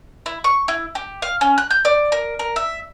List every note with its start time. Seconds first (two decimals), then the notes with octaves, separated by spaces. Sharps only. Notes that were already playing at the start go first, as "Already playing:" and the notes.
0.26 E4
0.44 C#6
0.68 E4
0.95 G4
1.22 F5
1.41 C#4
1.58 F#6
1.71 G6
1.85 D5
2.12 A#4
2.39 A#4
2.56 E5